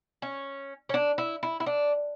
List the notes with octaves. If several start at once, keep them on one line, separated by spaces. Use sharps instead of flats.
C#4
C#4
D4
E4
E4
E4
D4